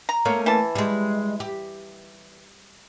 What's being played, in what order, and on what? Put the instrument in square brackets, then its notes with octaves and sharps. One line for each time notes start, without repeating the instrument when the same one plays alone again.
[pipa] A#5
[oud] A3 A#3 C#4
[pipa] E3 A5
[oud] G3 G#3
G4